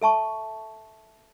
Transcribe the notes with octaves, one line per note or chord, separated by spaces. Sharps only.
A4 E5 A5 C#6